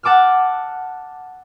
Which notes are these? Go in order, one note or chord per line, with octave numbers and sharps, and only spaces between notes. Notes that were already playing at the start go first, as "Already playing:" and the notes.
F#5 A5 D6 E6 F6